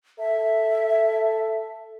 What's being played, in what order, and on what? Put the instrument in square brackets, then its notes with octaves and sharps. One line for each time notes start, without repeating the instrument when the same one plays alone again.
[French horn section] A4 [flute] E5